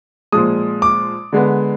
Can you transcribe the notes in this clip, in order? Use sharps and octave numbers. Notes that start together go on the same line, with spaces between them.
A#2 F3 G#3 D#6
D6
D3 G#3 B3